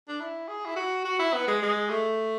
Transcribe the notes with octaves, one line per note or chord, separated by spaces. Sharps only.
D4
E4
G#4
E4
F#4
F#4
E4
B3
G#3
G#3
A3